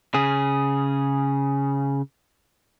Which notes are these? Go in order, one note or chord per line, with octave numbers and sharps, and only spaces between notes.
C#3 G#4